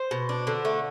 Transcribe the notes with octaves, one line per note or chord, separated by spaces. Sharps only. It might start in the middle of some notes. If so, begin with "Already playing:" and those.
Already playing: C5
B2
D4
D3
A3